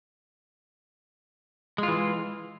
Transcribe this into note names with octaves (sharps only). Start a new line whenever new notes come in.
E3 G#3 F4